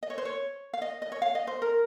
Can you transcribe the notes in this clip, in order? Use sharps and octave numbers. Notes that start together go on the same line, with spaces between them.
D#5
C#5
C5
C#5
F5
D#5
D#5
C#5
F5
D#5
C5
A#4